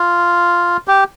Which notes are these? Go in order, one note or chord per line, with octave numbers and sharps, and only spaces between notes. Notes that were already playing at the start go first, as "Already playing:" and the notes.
Already playing: F4
G4